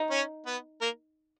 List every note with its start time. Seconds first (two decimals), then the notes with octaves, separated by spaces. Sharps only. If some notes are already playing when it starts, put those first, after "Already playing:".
Already playing: D#4
0.11 C#4 C#5
0.46 B3 B4
0.81 A#3 A#4